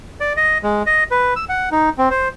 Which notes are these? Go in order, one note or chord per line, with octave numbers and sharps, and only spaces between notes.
D5
D#5
G#3
D#5
B4
E6
F#5
D#4
C4
C5